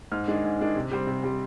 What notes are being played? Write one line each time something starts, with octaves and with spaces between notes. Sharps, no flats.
G#2 F6
D#3 G#3 D4
G#2
D#3 G#3 D4
C3
G3 C4
C3
G3 C4